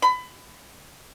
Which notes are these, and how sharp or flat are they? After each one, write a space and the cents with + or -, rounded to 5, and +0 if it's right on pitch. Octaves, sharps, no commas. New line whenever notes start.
B5 +25